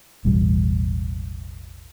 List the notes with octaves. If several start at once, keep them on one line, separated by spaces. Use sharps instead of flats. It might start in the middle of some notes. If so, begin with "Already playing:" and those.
E1 A1 G3